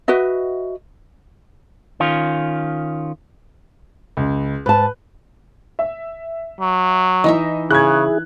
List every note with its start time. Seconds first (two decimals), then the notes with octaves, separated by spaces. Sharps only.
0.08 F#4 B4 D#5 E5
2.00 D#3 C#4 F4
4.17 C#2
4.66 G#2 B4 A5
5.79 E5
6.60 F#3
7.24 E3 D#4 D#5 E5
7.71 C#3 E4 G#4 F#6 G#6